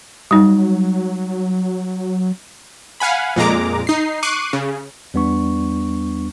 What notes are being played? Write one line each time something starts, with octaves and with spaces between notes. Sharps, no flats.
F#3 G3 D#4
F5 F#5 G#5 B5
F2 A#2 G#3 A#5 D6
D#4 C7
C#6 D6 F#6 C7 D#7
C#3
E2 G3 B3 D4 C#6